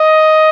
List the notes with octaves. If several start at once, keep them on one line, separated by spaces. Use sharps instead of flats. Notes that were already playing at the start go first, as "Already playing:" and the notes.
Already playing: D#5